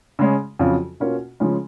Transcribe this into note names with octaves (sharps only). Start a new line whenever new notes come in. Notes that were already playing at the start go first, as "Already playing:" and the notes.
C#3 G#3 C#4
F2 C#3 F#3 C#4 F4
B2 A#3 C#4 F4
C#3 F3 G#3 C#4